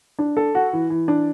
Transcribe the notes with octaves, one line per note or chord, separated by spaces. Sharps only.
D4
A4
F#4
E3
E3
D4